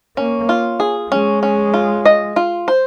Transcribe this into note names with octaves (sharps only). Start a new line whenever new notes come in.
A#3 C#4
F4
G#4
G#3 C#4
C#4
F4
D#5
F4
C5